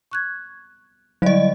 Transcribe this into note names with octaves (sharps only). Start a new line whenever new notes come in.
C#6 F#6 G#6
D3 F#3 G3 D5 D#5